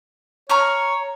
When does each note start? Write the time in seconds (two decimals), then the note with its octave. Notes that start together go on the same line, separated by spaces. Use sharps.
0.49 C#5 A#5 C#6 F6